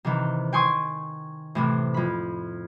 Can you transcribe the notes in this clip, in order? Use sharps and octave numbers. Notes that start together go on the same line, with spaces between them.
C3 D#3 E3
G5 G#5 C6 C#6 D#6
A2 C3 E3
F2 B5